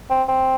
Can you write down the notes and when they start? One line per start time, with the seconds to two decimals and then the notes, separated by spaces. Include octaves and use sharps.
0.10 C4
0.28 C4